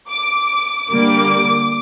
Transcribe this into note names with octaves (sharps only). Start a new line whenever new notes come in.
D6
D3 G3 A#3 D6